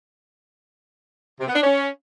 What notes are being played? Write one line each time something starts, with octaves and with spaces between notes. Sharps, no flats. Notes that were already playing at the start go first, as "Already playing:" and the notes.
C3
B3
D4
C#4